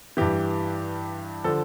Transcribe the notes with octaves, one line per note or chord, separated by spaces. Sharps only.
G2 E3 G4
D3 F3 A4